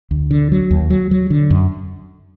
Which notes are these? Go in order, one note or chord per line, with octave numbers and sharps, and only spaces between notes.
D2
D3
F#3
D#2
F#3
F#3
D3
F#2